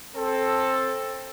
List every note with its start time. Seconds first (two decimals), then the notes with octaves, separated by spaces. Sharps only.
0.16 C4 A4